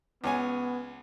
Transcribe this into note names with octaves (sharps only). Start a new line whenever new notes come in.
C#2 B3 C#5 G#5